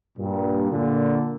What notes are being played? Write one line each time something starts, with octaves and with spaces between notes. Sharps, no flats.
G2 A#2
A#2 D3